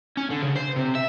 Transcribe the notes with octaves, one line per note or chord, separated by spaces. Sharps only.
C#4
D3
C#3
C5
C3
E5